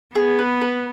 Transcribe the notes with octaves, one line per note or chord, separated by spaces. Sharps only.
B3 G#4
B4
B4